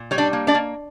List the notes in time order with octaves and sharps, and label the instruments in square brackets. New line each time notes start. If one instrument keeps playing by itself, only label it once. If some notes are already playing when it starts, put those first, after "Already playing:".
Already playing: [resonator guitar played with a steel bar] A#2
G3 C#5
D4 D5
A#3
D4 D5
A#3